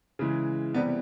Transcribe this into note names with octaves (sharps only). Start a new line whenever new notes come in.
C#3 E3 G#3
C3 E3 G3 B3